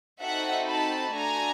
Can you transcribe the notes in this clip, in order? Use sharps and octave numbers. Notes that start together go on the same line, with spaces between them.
C4 D#4 F#4 A4 E5 F#5
A5 B5
A3 D4 F#4 A4 G#5 A#5